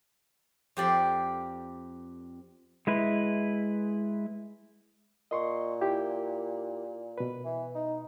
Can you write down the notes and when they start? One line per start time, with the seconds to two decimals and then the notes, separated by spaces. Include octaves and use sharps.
0.77 F2 G4 D5 C6
2.87 G#3 E4 B4
5.31 A#2 D#5 C6 C#6
5.81 E4 G4
7.18 B2 B4
7.45 E3
7.75 D#4